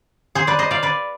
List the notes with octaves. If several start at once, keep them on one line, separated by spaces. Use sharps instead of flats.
G#4 C5
B4 D5
C5 D#5
D5 F5
B4 D5